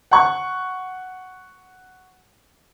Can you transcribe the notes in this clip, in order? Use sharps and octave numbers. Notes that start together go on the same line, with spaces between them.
F#5 C#6